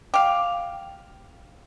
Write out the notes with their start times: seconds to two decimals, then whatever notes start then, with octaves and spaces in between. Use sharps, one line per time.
0.14 G4 F5